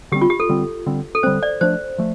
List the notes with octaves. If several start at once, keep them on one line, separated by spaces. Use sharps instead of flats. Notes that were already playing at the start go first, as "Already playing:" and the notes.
D3 G3 C4 G4
F4
G4
A4
D3 G3 C4
D3 G3 C4
A4
D3 G3 C4 C5
D5
F3 A3 D4 C5
F3 A3